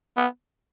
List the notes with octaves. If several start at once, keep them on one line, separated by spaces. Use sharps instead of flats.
B3